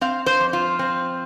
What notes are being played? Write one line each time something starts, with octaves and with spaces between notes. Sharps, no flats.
C4 F5
C5
F2
F4
C4